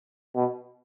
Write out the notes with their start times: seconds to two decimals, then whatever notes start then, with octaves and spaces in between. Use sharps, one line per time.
0.35 B2